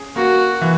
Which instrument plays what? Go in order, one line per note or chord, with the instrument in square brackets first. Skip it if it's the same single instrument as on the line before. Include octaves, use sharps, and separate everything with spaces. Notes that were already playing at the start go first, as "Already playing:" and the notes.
Already playing: [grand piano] C#4 G#4
[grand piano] A#3 [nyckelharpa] F#4
[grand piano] E3